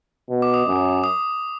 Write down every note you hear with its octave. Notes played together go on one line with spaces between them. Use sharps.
B2
D6
D#6
F#2
D#6